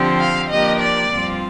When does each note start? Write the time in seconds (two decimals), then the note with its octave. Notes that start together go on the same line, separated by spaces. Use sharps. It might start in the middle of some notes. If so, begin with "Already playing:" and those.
Already playing: D3 F3 C4 G4 C5
0.20 F5
0.50 F3 A#3 D4 G4 A#4 D#5
0.80 D5
1.09 G2 F3 C4 F4